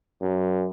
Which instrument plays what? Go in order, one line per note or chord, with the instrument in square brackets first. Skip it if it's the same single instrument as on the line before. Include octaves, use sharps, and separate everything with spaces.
[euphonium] F#2